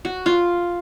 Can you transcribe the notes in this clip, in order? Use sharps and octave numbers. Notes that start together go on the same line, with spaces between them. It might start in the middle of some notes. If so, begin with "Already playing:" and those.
F#4
F4